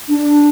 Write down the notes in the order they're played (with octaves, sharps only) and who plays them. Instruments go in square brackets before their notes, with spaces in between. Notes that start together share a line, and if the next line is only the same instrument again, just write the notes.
[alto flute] D4